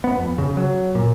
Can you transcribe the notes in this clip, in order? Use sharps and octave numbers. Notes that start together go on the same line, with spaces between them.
B3
F2
C#3
F#3
A#2